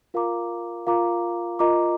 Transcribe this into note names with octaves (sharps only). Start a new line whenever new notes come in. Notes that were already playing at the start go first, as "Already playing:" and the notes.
F4 A#4 F5 A#5 D6
F4 A#4 F5 A#5 D6
F4 A#4 D#5 A#5 D6